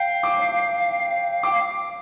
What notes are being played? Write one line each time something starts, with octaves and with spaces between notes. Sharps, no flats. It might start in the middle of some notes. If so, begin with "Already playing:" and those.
Already playing: F5 G5
D6
G5 D6
F5